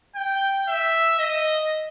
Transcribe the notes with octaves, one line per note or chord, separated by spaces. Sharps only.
G5
E5
D#5